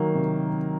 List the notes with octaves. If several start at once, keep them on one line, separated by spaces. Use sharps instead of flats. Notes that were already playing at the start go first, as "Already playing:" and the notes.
Already playing: D#3 F#3 A#3
C3
C3